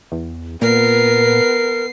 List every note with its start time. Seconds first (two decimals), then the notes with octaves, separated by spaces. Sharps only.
0.12 E2
0.61 A#2 B3 A#4 C7